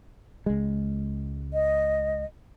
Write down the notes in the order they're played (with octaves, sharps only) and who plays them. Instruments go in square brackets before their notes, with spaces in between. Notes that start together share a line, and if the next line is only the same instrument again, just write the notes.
[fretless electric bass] C#2 G#3
[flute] D#5